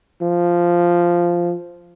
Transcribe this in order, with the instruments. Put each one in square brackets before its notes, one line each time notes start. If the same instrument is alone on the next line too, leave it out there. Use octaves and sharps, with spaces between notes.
[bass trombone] F3